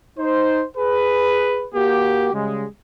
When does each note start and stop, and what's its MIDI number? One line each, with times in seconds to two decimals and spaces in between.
0.18 0.64 63
0.18 0.64 72
0.77 1.66 68
0.77 1.66 71
1.74 2.29 58
1.74 2.29 66
1.74 2.29 67
2.33 2.66 49
2.33 2.66 55
2.33 2.66 56